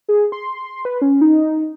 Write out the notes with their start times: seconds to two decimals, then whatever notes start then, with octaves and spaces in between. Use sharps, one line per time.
0.08 G#4
0.32 C6
0.85 B4
1.02 C#4
1.21 D#4